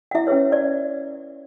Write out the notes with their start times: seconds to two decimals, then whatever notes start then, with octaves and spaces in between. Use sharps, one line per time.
0.11 F#5
0.15 E4 E5
0.27 C#4 G#4 B4 C#5
0.52 D5